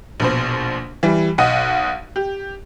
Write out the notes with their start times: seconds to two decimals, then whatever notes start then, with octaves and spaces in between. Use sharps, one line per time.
0.20 A#1 B2 C5
1.03 E3 G3
1.38 B1 D#5 F#5 D#6 D#7
2.16 G4